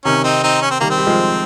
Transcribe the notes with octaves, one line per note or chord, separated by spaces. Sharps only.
C3 D#3 C#4
C4 D#4
C4 D#4
C#4
C4
D#3 G3 A#3
C4
G3
F3 G#3